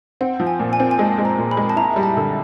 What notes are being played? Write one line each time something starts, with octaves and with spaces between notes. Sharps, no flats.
C4 F#5
F3
G#5
A#2
G#5
C4
G#5
G#3 A5
G#3
A#5
A#2
B5
G#3
A5
E4 A#5
G3
A5
D3